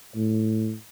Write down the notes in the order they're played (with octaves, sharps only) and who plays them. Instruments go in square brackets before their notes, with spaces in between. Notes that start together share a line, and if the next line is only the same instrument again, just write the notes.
[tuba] A2